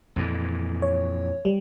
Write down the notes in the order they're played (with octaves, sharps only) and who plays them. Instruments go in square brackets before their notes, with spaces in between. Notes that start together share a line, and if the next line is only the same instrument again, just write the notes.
[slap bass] F2 A#2 E3
[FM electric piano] C#5
G3